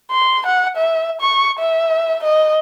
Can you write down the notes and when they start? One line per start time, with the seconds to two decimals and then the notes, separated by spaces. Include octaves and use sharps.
0.11 C6
0.46 F#5
0.77 E5
1.21 C#6
1.59 E5
2.23 D#5